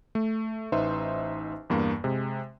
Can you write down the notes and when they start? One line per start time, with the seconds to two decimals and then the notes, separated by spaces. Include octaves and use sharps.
0.15 A3
0.72 A1 D#4 B4 C5 E5 C6
1.70 E2 G2 A#3
2.04 C3 G#3